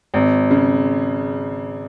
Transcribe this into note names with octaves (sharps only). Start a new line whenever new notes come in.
G#1
C#3